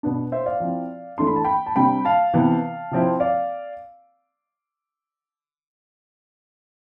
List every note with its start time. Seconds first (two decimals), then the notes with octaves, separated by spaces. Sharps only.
0.03 B2 B3 D4
0.32 C5 E5
0.46 D5 F5
0.60 F3 C4 E4
1.18 E3 A3 D4 C6
1.27 B5
1.36 A5
1.44 G5 B5
1.66 A5
1.76 C3 G3 D4 G5 B5
2.05 F5 A5
2.34 C3 E3 B3
2.91 C3 F3 C4 E4
3.20 D5 F5